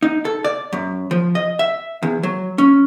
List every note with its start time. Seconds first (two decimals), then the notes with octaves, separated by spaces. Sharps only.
0.02 D#4
0.25 A4
0.44 D5
0.73 F#2
1.11 F3
1.35 D#5
1.59 E5
2.03 E2
2.23 F#3
2.58 C#4